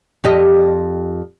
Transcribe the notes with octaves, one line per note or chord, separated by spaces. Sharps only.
F2 G4 D#5